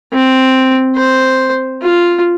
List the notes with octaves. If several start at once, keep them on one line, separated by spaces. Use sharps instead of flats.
C4
C5
F4